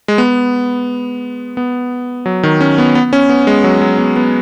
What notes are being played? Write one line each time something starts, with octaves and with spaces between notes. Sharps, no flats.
G#3
B3
B3
F#3
D#3
C#4
B3
B3
C#4
B3
G#3
F#3
F#3
B3
B3